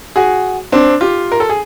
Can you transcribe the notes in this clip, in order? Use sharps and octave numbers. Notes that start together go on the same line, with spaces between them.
F#4 G#4
C4 D4
F4 G4
A#4
A4
G#4